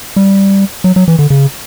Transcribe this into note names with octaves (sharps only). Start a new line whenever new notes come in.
G3
F#3
F#3
E3
D3
C#3